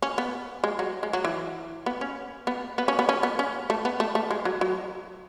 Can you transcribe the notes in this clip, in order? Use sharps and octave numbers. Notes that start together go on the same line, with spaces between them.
C#4
B3
G#3
F#3
G#3
F#3
E3
B3
C#4
B3
B3
C#4
B3
C#4
B3
C#4
A3
B3
A3
A3
G#3
F#3
F#3